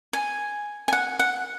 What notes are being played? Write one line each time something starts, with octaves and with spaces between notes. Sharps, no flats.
G#5
G#5
F#5
F#5